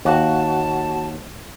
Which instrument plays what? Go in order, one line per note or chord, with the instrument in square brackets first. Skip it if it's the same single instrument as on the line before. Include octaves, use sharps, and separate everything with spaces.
[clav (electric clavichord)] D#2 [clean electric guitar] F#4 [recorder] A5